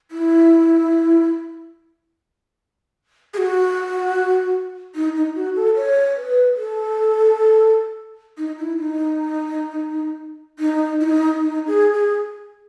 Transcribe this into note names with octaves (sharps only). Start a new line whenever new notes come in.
E4
G#4
F#4
D#4
D#4
F#4
A4
C#5
B4
A4
D#4
E4
D#4
D#4
E4
D#4
D#4
G#4
G#4